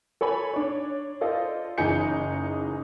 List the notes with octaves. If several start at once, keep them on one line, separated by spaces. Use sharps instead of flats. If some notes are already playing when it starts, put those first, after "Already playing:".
A4 C#5 G#5 B5
D4 C#5
F4 A4 C5 D5 D#5
F#1 E3 D#4 G#4 G6 C#7